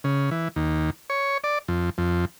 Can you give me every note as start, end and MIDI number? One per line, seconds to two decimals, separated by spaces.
0.04 0.30 49
0.31 0.48 52
0.56 0.90 39
1.10 1.38 73
1.44 1.59 74
1.68 1.90 41
1.98 2.25 41